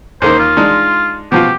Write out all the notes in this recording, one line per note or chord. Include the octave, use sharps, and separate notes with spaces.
D#2 A#3 D#4 C5
F4
G#3 D4 D#4
B2 F3 F4 G4